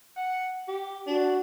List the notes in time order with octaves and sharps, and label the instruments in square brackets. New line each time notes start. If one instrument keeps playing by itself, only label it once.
[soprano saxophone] F#5
G4
[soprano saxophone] D4 [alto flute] F#4